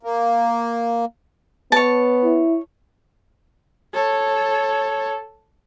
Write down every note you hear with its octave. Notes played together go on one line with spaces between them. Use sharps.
A#3
B3 C#5 A5
E4
A4 C#5